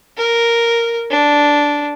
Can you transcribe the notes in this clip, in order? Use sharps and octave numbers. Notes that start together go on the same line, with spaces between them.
A#4
D4